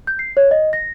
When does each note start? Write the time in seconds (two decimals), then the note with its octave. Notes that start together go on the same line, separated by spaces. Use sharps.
0.07 G6
0.19 C7
0.37 C#5
0.51 D#5
0.73 A#6